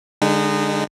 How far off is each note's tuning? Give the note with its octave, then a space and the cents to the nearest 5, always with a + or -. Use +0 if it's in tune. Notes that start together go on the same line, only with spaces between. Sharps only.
D3 +0 G#3 -25 D#4 -25